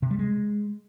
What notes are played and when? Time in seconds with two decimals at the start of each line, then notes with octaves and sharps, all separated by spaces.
0.02 C3
0.11 G3
0.19 G#3